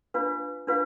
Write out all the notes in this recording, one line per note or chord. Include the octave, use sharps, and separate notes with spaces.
D4 F4 B4 F5
D4 F4 B4 F5